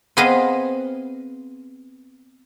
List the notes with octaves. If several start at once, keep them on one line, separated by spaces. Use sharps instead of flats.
B3 C4 G#4 B4 D#5 F5